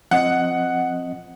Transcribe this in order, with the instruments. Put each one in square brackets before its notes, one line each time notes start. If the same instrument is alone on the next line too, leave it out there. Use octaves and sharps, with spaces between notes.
[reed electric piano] F3 C4 D#5 [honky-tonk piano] F#5